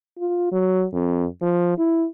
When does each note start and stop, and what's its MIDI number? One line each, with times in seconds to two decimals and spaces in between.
0.19 0.49 65
0.52 0.84 54
0.93 1.25 41
1.42 1.76 53
1.78 2.06 64